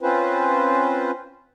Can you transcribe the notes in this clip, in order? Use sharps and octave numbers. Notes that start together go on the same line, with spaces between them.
C4 C#4 F4 B4 C5